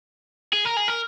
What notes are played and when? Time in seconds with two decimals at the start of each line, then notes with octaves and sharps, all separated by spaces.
0.53 G#4
0.65 A#4
0.77 G#4
0.88 A#4